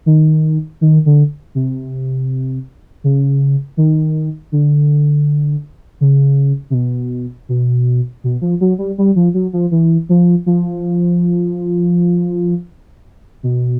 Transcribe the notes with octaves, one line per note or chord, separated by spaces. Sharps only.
D#3
D#3
D3
C3
C#3
D#3
D3
C#3
C3
B2
B2
B2
F3
F#3
G3
G3
F3
F#3
F3
E3
F3
F3
B2